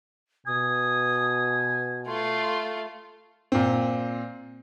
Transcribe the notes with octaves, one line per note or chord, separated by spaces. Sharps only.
B2 G#5 D#6
A3 F4 C6
A#2 C4